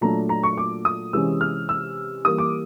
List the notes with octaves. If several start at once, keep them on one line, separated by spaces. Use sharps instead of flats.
A#2 F#3 A3 D4 A#5
A#5
C#6
D6
D#6
C3 E3 G#3 C#4 E6
F6
E6
E3 G3 A#3 D#6
D6